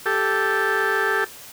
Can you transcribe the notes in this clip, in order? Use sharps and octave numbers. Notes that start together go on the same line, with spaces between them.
G4 A4